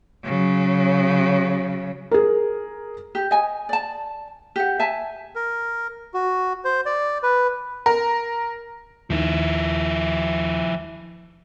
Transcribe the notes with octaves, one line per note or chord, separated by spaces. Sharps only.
C#3 F#3
G#4 A#4
G4
D#5 G#5
D5 A5
G4 F#5
E5 G#5 A5
A#4
F#4
C5
D5
B4
A#4
D#2 D#3 F3 E4